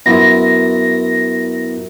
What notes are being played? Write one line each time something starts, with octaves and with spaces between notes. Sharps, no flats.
F#2 B3 E4 F4 A#6